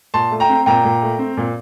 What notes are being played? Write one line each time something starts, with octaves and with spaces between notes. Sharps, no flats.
A#2 A5 C6
A3
G5 A#5
C4
A#2 G5 A#5
A#2
A3
C4
A#2